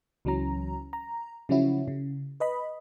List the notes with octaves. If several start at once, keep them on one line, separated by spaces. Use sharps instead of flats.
C#2 E3 F#3 C#4 A#5
A#5
C#3 F3 F#3 C#4 E4 F#4
C#3
B4 D#5 B5